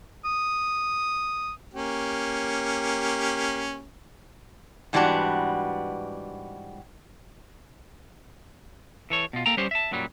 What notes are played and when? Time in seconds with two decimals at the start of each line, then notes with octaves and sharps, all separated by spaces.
0.25 D#6
1.74 A#3 C#4 G4
4.93 G#2 E3 G3 B3 D4 F#4
9.10 E3 A4 C#5
9.33 B2 F4
9.46 A#3 A4 G5 A#5
9.57 G3 B3 C#4 G4 C5
9.71 E5 A5
9.91 F#2 A#2 F#3 G3